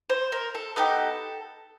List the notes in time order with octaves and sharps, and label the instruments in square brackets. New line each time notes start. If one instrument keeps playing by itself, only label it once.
[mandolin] C5
A#4
A4
B3 D#4 G4 A4